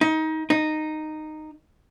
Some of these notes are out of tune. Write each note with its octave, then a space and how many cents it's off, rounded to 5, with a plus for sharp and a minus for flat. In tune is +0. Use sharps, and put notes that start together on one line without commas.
D#4 +25
D#4 -10